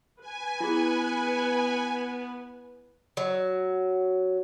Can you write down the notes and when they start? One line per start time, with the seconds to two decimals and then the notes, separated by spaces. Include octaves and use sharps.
0.21 B4 G#5
0.61 B3 E4 G#4
3.17 F#3